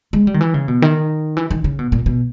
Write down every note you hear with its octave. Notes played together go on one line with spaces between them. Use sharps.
G#3
G3
D#3
E3
C#3
B2
D#3
E3
D#3
C#3
B2
A#2
B2